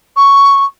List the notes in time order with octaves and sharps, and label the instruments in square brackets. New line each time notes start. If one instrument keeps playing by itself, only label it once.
[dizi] C#6